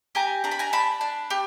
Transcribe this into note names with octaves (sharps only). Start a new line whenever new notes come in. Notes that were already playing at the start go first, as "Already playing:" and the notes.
G4 G#5 A#5
D4 A#5
B5
G#5 A#5
D4 A5 B5
D4
G4